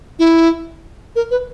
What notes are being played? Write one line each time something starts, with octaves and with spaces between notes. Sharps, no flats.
E4
A#4
B4